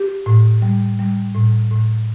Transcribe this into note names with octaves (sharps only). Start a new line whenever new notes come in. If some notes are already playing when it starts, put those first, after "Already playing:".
Already playing: G4
A2
G3
G3
A2
A2